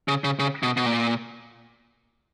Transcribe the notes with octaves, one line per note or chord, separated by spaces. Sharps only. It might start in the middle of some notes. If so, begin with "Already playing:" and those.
C#3
C#3
C#3
B2
B2
A#2